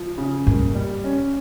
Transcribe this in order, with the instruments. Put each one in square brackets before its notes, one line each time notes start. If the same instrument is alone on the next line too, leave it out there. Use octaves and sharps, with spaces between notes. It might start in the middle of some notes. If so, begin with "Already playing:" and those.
Already playing: [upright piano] F3
C#3
[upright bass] G2 [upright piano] A#3
[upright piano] G3
C#4